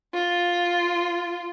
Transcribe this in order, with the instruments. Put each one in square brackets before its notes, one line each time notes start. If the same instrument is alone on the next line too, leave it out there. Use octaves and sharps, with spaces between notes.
[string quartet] F4